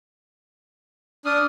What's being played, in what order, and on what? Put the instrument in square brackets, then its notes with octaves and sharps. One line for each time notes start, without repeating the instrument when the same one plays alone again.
[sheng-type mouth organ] D4 D#6 [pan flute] F6